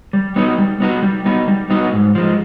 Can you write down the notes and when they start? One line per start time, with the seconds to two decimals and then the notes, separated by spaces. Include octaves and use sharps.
0.13 G3
0.36 B3 D#4 F#4
0.58 G3
0.80 B3 D#4 F#4
1.02 G3
1.25 B3 D#4 F#4
1.48 G3
1.70 B3 D#4 F#4
1.93 G#2
2.15 F3 G#3